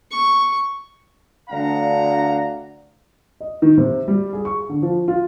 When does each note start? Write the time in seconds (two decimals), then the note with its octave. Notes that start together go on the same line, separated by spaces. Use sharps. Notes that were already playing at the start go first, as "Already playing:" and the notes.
0.11 C#6
1.50 D2 D4 F5 F#5 A#5
3.40 D#5
3.62 D#3
3.78 C3
4.08 G3
4.33 G#4
4.45 C#6
4.69 D3
4.82 F3
5.08 F4